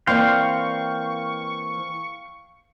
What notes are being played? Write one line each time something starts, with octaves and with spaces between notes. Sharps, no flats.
E3 A#3 C4 D5 F5 G5 C6 C#6